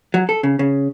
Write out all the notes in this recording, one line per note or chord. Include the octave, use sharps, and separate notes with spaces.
F#3
A4
C#3
C#3